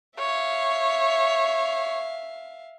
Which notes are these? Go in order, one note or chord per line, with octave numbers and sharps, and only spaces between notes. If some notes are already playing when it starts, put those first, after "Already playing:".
C#5 E5 F5